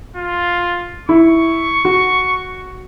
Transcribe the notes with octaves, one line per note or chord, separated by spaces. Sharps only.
F4
E4 C#6
F#4